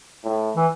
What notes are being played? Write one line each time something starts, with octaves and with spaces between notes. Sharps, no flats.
A2
E3